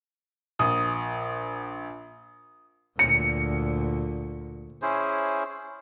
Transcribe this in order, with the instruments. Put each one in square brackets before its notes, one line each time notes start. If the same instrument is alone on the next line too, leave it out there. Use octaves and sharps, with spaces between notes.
[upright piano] A#1 D#6
[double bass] D2 A#2 [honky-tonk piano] C#7
[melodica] C#4 E4 G#4 C5